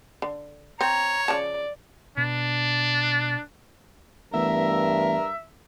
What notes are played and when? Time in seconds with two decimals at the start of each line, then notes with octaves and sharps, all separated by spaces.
0.22 D3
0.81 C4 C#5 A#5
1.28 C#3 F3 D5 A5
2.18 B2 D4
4.34 G2 E3 A3 B3 A#4 E5